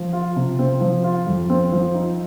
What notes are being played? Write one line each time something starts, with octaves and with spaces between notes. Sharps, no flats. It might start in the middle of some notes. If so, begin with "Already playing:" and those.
Already playing: F3
F4
C3
C4
F3
F4
F2
C4
F3
D#4